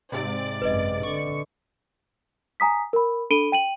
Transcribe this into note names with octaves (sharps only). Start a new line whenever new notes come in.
G#2 C3 D5
G#1 F#2 B4 D#5
D3 C#6
G#5 A#5 D#6 B6
A#4 B5
D4 A4 B5 D7 D#7 G7
G5 D#7 F#7